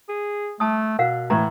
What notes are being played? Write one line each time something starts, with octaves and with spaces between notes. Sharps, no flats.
G#4
A3 A5 D#6
B2 A#4 F5 F#5
A2 E3 A#5